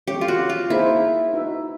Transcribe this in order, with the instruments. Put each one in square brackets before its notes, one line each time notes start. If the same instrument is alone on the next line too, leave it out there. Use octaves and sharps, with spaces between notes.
[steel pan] G#3 C#4 E4 A4 C#5 [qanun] G4
[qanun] F4
F#4
F4
[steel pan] A#3 D#4 G#4 C5 F5 [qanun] E4
[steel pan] D#4 F#4 B4 E5